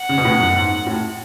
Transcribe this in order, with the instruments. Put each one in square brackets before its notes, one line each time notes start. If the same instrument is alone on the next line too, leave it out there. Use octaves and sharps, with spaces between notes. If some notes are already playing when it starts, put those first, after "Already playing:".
Already playing: [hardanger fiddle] F#5
[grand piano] C#3
B2
A2
F#2
G#2
A2